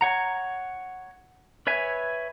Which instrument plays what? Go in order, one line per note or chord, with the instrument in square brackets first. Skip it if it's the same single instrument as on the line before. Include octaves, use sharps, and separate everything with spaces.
[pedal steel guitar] C#5 F#5 A#5
B4 C#5 E5 G#5